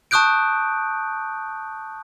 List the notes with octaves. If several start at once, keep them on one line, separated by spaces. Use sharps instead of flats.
A5 C#6 D#6 F#6 G6 D7